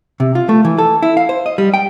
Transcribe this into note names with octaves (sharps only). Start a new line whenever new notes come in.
C3
F4
A3
E3
A4
E4
F5
C5
D#5
G3
G5